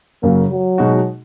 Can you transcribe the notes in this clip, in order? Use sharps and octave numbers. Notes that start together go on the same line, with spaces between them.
F#2 C#3 F#3 A#3
F#3
B2 G#3 D#4 F#4